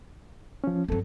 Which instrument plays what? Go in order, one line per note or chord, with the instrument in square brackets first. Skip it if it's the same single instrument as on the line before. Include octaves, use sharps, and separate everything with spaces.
[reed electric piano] F3 C#4
[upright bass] G2 F#3 [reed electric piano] C4 A4